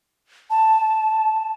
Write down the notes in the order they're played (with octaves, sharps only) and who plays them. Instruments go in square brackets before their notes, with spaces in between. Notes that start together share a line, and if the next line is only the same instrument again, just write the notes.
[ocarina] A5